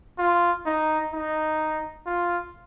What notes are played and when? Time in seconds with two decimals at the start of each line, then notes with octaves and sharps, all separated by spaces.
0.18 F4
0.66 D#4
1.13 D#4
2.06 F4